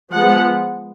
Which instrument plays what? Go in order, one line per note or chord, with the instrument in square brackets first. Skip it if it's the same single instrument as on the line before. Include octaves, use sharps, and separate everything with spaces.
[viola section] F3 G#3 B3 F#5